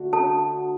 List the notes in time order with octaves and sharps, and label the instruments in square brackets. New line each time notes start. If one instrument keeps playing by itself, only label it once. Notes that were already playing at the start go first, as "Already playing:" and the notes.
Already playing: [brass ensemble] D3 A3 D4 F#4
[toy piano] A4 A5